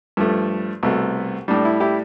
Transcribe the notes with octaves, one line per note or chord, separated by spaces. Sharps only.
G2 F3 A3
C2 B2 A3
A2 G3 D4
E4
E4 G4